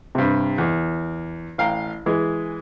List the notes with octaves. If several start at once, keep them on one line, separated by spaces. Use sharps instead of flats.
G2 C3
E2
A1 F5 G5 A#5
E3 G#3